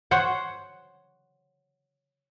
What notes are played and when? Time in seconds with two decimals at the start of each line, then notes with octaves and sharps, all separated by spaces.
0.11 C5 C#5 F#5